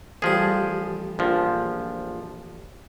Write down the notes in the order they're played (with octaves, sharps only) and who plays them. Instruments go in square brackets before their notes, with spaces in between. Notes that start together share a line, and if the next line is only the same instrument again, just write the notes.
[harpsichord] A1 G3 [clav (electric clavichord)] F3 G#4
[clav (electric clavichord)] A#1 F3